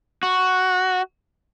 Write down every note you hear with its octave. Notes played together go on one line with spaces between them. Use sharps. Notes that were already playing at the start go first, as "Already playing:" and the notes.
F#4